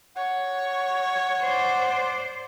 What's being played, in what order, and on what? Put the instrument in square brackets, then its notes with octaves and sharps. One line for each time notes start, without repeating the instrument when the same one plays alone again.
[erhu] C#5 [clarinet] F#5
[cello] C5 D5